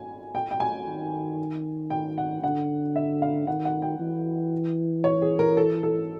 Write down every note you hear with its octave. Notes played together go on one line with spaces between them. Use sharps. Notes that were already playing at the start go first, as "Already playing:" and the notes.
Already playing: G#5
G5
G5
G#5
D#3
G5
F#5
D3 F#5
E5
F5
D#3 F#5
F#5
G5
E3
C#5
G#4
A#4
A4
A4